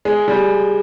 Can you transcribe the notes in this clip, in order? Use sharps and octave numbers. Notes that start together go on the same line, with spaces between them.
G#3
G3